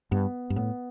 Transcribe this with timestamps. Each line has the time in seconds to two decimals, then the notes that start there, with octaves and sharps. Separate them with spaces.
0.11 G2 B3
0.50 G2
0.56 A2 B3